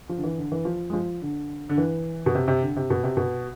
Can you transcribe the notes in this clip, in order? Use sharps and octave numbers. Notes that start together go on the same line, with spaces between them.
F3
D3
E3
D3
E3
F3
G#3
F3
D3
D3
E3
B2
C3
C3
D3
C3
B2
C3
B2